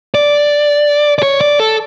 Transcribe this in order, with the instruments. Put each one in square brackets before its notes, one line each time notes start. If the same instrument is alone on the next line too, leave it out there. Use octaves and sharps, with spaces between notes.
[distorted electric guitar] D5
D5
C#5
D5
A4